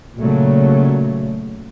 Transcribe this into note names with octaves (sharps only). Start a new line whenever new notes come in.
A#2 C#3 F#3 A3